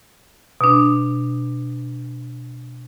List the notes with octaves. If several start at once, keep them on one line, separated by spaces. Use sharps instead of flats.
B2 D4